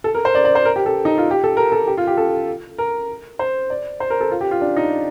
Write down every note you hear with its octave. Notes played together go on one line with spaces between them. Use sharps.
A4
A#4
C5
D5
D5
C5
A#4
G4
A4
D#4
F4
G4
A4
A#4
A4
G4
F4
G4
A4
A#4
C5
D5
C5
A#4
A4
F4
G4
F4
D4
D#4